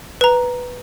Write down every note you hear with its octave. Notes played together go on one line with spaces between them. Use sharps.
B4 A#5